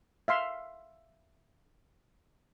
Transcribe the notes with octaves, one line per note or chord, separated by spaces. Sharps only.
E5 F5 C6